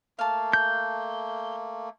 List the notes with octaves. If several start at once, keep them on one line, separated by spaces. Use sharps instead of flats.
A3 A#3 F5 A5
G6